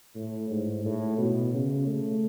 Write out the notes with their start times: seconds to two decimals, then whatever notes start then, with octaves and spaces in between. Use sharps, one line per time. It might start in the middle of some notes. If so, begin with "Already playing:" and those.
0.15 A2
0.51 G#2
0.85 A2
1.18 B2
1.53 C#3
1.87 A3